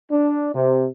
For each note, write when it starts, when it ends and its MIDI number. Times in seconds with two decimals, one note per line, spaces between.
0.11 0.52 62
0.54 0.86 48